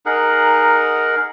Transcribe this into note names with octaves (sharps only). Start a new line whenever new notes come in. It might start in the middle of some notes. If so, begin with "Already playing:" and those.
D#4 G#4 A#4 F#5